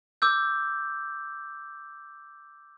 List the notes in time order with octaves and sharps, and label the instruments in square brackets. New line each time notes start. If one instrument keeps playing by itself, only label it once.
[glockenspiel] D6 E6 G6